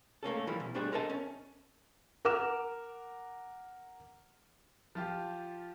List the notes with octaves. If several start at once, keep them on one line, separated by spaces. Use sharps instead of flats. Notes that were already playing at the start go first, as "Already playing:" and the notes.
A3 A#3 C#4 A4
E3 F3 G3 E4
B1
G3 A3 D4 G4 G#4 C5
A4 A#4 C5 D#5 E5 A5
C#4
A#4 F#5 D6 F6 E7
F3 F4 G4